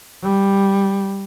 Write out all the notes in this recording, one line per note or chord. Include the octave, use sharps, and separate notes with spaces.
G3